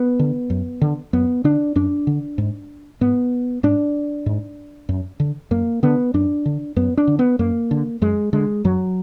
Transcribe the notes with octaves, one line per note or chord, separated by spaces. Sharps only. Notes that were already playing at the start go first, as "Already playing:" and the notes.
Already playing: B3
D3
F#2
D3
F#2 B3
D3 D4
F#2 D4
D3
G#2
G#2 B3
G#2 D4
G#2
F#2
D3
F#2 A#3
D3 B3
F#2 D4
D3
F#2 B3
D4
D3
B3
F#2 A#3
D3
F#2 G#3
D3 G#3
F#2 F#3